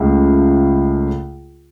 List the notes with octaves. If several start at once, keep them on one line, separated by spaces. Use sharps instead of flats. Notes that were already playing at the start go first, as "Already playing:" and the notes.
Already playing: C#2 C#3 A3